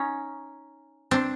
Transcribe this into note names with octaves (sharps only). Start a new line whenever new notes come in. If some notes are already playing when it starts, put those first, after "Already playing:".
Already playing: C#4 D#4
C4 D4